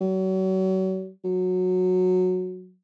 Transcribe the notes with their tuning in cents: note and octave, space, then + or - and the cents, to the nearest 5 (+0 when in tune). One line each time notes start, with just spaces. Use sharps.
F#3 +35
F#3 -15